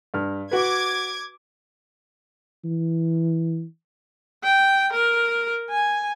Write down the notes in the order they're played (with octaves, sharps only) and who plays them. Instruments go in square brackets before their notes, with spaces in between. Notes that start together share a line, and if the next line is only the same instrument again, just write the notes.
[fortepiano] G2 F6
[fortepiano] F#4 B4 [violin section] D6 G#6
[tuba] E3
[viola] G5
A#4
G#5